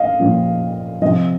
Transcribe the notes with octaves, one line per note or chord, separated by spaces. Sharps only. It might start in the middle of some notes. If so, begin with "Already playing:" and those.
Already playing: D#5 F5
A#2 F3
C3 F3 D#5